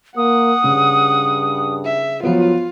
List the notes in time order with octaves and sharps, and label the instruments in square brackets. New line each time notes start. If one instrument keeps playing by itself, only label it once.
[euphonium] A#3 [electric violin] F#5 [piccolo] D#6
[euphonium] G2 [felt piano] C#3
[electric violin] E5
[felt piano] F3 B3 [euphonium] F#3 [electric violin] F4